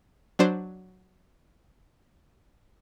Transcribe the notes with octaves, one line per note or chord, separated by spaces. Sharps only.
F#3 D4 C5